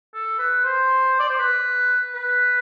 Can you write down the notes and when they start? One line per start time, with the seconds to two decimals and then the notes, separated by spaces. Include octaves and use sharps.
0.14 A4
0.39 B4
0.64 C5
1.19 D5
1.29 C5
1.39 B4
2.15 B4